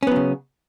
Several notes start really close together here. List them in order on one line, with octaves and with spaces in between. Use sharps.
C#4 B3 F#3 C#3